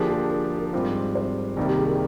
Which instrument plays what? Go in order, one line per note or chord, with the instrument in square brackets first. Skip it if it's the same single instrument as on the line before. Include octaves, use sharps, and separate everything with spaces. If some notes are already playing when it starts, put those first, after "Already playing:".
Already playing: [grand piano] D3 F3 A#3 D4 G4 [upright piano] G#4
[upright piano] G#4
A#4
A#4
[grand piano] G#2 G3 C4 F4
[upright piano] C5
[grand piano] C2 C3 D#3 G3 A#3
[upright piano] G4
G#4
A#4